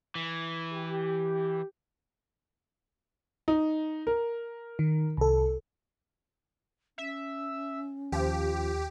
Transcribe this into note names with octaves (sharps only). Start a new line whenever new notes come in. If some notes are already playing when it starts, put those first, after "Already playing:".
E3
G4
D#4
A#4
D#3
C2 A4
C#4 E5
D#2 F3 G4